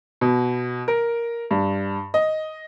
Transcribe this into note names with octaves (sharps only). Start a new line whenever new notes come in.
B2
A#4
G2
D#5